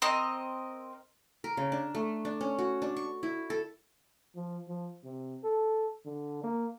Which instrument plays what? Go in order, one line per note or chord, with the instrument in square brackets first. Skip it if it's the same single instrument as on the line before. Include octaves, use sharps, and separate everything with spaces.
[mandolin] C4 A#4 D#5
[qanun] A#4
C#3
D4
A3
D4
C#4
F#4
D4
C#6
E4
A4
[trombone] F3
F3
C3
A4
D3
A#3